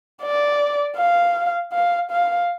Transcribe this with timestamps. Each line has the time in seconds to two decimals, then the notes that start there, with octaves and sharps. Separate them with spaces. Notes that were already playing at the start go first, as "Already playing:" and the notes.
0.22 D5
0.97 F5
1.73 F5
2.11 F5